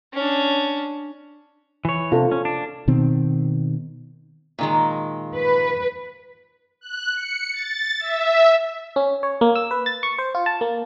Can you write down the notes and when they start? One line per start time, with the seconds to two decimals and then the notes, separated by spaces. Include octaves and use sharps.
0.13 C#4 D4
1.85 E3 C#5
2.12 C3 F4 A4
2.32 C#4
2.45 D4
2.88 B2 D#3 C4
4.59 A#2 D#3 G#3
5.34 B4
6.81 F#6
7.13 C#7
7.52 A6
7.99 E5
8.96 C#4
9.23 C#5
9.41 A#3
9.55 E6
9.71 B4
9.86 A6
10.03 C#6
10.18 C5
10.35 F4
10.46 A5
10.61 A#3